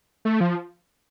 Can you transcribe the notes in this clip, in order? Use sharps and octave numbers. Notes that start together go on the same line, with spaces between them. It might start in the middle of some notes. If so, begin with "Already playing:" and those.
A3
F3